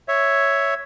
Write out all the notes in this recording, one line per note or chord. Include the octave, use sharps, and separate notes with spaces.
C#5 E5